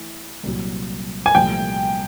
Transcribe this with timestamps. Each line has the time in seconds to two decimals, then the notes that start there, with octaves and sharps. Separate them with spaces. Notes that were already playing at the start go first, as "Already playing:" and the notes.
Already playing: E3 A3
0.43 C2 A#2 F#3
1.26 G#5
1.35 C2 A#2 F3 A3 G5